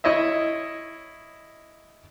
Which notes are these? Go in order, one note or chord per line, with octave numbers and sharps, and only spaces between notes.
E4 C#5 D#5 E5